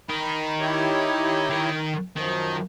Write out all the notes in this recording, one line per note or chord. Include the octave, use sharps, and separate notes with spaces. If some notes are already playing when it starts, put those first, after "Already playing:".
D#4 A#4 B5
E4 G4 C#5
D#3 A#4
F#2 D#3 F3